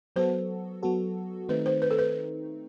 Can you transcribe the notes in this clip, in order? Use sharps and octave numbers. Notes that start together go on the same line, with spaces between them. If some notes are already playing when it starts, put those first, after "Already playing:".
F#3 B3 F#4 A4 C5
F#3 B3 F#4 A4
D#3 A3 C4 D#4 B4
C5
B4
A4
B4